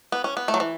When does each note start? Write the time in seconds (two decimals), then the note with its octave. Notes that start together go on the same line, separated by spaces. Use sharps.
0.12 B3
0.24 C#4
0.37 B3
0.48 A3
0.54 F#3
0.60 E3